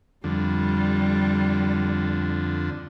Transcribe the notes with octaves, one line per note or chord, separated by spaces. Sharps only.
F2 D3 G3